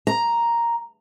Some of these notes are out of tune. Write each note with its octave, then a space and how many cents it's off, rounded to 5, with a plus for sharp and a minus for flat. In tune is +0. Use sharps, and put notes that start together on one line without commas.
A#5 +5